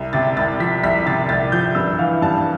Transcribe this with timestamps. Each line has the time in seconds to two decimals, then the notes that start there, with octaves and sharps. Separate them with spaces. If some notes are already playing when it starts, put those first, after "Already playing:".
Already playing: C2
0.13 C3 A6
0.37 C2 A6
0.60 F3 B6
0.83 C2 B6
1.07 C3 A6
1.29 C2 A6
1.52 F3 G6
1.75 G2 E6
1.98 E3 F5
2.22 G2 A5